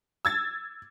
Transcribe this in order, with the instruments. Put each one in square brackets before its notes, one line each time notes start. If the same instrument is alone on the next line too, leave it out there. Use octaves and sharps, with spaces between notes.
[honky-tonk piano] E6 G#6 A6